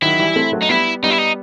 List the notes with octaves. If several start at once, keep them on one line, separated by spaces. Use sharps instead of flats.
D#3 F#3 E4
E3 G3
A3 C4
F#3 A3
D#4
G3 B3 E4
G3 B3 D#4
E4
D#4